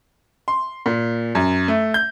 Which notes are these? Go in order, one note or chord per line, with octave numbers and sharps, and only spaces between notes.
C6
A#2
F#2
A3
G6